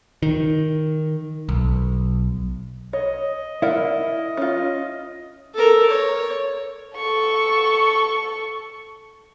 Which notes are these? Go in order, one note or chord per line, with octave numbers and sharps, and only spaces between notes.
D#3
B1
C#5 D#5
E4 A#4 D5 F#5
C#4 F4
A4 A#4
C#5
A4 C#6